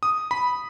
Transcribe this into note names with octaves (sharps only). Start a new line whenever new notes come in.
D#6
B5